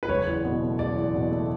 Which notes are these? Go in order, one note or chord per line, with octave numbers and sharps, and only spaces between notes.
B4
F#1 C#5
E2
B2
A3
F#1 D5
E2
B2
A3